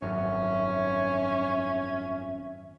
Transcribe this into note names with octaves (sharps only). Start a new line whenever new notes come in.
G#1 F#2 C#4 E5